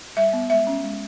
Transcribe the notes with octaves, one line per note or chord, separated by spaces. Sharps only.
G3 E5
B3
G#3 E5
C#4
G#3